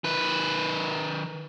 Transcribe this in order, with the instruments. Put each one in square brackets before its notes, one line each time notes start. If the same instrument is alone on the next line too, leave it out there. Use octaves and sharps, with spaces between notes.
[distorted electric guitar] D#3 B4